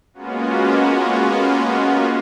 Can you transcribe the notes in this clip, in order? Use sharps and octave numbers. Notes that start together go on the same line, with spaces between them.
G#3 A#3 B3 C#4 F4 F#4